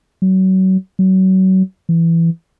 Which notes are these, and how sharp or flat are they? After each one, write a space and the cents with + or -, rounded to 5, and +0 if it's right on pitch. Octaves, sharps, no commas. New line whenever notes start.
F#3 +30
F#3 +30
E3 +15